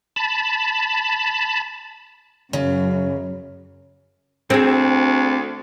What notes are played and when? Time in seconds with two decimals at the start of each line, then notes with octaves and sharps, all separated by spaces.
0.16 A5 B5
2.53 F#2 C#3
4.50 D2 C4 G#4